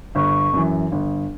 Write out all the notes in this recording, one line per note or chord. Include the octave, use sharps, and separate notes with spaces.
G1 C#6
F#2 E3
G1